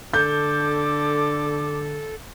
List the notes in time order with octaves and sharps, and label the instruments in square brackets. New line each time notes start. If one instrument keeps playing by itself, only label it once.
[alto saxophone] D3 [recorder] A4 [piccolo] D6 [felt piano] G6